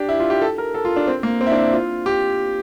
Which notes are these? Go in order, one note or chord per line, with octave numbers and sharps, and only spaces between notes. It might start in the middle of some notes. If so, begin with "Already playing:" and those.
Already playing: D4 G4
E4
F4
G4
A4
A#4
A4
F4
D4
C4
A#3
C4
E4
D4
F4
G4